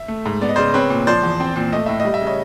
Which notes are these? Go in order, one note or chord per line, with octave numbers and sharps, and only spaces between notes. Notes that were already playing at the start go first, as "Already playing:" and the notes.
Already playing: E5
A3
G#2
B3 D5
D#5
C#3 C5 D5
C4 B4 C#5
A#2
F3 C5 D5
E2
C4
A#2
A3 D#5
A2 E5
D#5
G3
E5
C#3
C#5 D#5